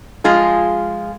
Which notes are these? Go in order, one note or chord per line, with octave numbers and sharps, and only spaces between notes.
F3 G#3 F4 G#4